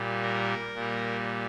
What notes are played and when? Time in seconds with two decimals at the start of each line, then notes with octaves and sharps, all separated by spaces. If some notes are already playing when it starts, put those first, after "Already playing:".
Already playing: A#2 G3
0.23 A#4
0.75 A#2 G3